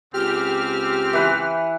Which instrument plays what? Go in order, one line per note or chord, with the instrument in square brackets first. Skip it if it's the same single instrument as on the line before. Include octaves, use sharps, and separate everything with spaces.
[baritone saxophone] C#2 [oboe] C4 [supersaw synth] G4 F6
[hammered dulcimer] E3 B4 F#5